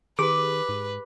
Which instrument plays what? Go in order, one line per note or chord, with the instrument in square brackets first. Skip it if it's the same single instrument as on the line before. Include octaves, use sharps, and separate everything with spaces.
[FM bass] D#3 [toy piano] G4 G#4 [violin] B4 [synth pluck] D6
[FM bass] G#2